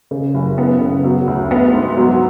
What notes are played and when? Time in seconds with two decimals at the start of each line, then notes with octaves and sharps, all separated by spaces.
0.11 C#3
0.34 F#1
0.58 B3
0.81 C#3
1.04 F#3
1.27 D2
1.51 B3
1.73 G#2
1.97 F#3